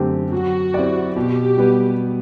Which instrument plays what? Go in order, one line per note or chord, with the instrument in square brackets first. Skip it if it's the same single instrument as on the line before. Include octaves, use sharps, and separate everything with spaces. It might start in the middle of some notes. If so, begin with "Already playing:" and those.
Already playing: [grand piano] F#2 D3 A3 C4 G4
[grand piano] F#3 [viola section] F#4
[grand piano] C4 E4 G4 D5
[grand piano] B2 [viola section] G4
[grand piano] G3 B3